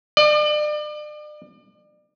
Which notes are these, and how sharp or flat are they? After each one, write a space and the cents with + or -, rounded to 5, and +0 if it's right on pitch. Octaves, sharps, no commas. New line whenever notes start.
D5 +35